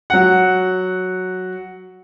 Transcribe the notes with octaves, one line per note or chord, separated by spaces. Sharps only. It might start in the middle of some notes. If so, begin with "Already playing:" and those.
F#3 F#5